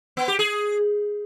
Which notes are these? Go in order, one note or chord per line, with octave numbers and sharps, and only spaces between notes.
B3
G4
G#4